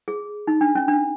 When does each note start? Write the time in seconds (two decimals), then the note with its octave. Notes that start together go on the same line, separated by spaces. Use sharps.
0.08 G#4
0.47 D#4
0.61 D4
0.75 C#4
0.88 D4